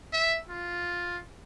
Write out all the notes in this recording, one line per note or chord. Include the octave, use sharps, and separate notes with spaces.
E5
F4